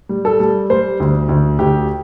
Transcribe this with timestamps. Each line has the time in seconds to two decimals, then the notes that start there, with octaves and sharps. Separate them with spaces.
0.09 G3
0.25 A4
0.40 G3
0.70 G3 C5
1.00 D2
1.29 D2
1.59 D2 G4